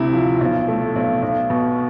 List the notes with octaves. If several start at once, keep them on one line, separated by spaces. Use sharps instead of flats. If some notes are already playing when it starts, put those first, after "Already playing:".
Already playing: D2 C3 E4
F3
B1
A3
B1
B1
B2